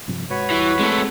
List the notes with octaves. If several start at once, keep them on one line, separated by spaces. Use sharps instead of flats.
G2 C3 F3
G#2 F#4 B4 C#5
E2 E3 G3
G#3 A3 C4